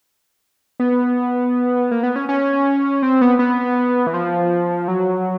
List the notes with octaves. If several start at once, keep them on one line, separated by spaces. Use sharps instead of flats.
B3
A#3
B3
C#4
C#4
C4
B3
B3
E3
F3
F#3